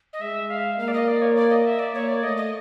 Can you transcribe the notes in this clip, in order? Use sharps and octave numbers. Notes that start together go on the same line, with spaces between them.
D#5
G#3 E5
F5
A#3 F5
D5
D#5
D5
C#5
D5
D#5
E5
D5
A#3 C#5
D5
A3 D#5
D#5